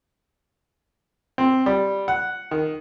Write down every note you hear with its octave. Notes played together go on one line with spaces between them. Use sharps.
C4
G3
F#5
D#3